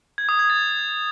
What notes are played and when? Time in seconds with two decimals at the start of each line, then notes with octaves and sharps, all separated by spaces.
0.18 G#6
0.29 D#6
0.39 G#6
0.50 A6